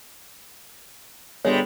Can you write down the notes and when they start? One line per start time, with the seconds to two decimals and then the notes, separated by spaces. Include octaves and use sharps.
1.45 G1 G3 G#3 C#5